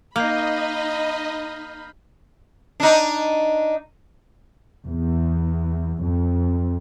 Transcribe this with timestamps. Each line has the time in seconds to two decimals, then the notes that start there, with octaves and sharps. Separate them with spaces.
0.16 A#3 D#4 D#5 B5 F6 G6 C7
2.80 D4 D#4
4.87 E2
6.03 F2